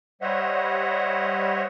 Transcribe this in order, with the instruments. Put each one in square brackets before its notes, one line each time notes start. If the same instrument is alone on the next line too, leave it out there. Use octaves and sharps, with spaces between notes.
[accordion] G3 C5 C#5 D#5 E5 F#5